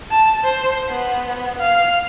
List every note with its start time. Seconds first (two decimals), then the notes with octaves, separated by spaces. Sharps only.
0.11 A5
0.44 C5
0.89 B3
1.59 F5